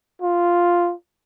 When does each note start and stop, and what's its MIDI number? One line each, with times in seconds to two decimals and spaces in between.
0.21 0.93 65